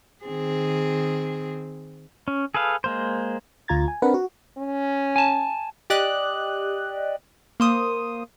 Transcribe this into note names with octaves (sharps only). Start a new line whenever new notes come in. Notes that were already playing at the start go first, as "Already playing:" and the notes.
D#3 C4 G#4
C#4
G#4 A4 B4 F5
G#3 A#3 C5
D2 F4 A#5 G#6 A6
G#5
C4 D4 A#4 B4 F#5
F#4
C#4
G#5 A5
G4 D5 D#5 F#6
A#3 C5 D#6